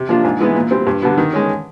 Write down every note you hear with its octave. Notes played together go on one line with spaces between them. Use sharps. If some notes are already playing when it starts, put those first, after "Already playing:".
Already playing: C3
F3 A#3 D4 F4
G#2
E3 G#3 B3
A#2
G3 C4
G2
D3 G3 B3
D#3
G#3 C#4